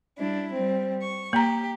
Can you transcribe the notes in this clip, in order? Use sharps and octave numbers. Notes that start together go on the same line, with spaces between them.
G3 D4 E4
G3 C4
C#6
A#3 G4 A#5